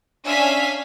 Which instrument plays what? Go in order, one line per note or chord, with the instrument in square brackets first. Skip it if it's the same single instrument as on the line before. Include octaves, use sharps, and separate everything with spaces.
[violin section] C#4 D4 E5 F5 G#5 B6